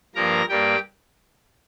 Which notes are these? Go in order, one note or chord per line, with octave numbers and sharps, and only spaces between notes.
G2 F3 A#3 A#4 A#5
G2 G3 A#3 G4 G5